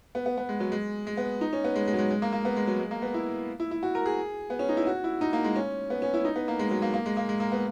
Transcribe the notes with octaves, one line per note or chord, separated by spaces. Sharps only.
B3
B3
B3
G#3
F#3
G#3
G#3
B3
D#4
C#4
B3
G#3
G#3
F#3
G#3
G#3
A#3
A#3
B3
G#3
F#3
G#3
A#3
B3
E4
E4
E4
F#4
A#4
G#4
B3
C#4
D#4
E4
F#4
E4
D#4
A#3
G#3
C#4
B3
C#4
E4
D#4
B3
A#3
G#3
F#3
A#3
A#3
G#3
A#3
G#3
A#3
B3